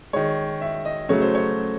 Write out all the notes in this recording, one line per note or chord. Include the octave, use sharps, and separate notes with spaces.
D#3 G#3 C#5
E5
D#5
C#3 F#3 A3 C#5
C5
C#5